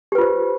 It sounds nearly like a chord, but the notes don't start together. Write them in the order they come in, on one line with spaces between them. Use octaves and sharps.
G4 B4 F4 C5